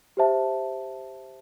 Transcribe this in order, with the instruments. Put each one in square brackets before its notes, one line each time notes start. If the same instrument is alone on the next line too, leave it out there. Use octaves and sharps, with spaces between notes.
[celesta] G4 C5 E5 A5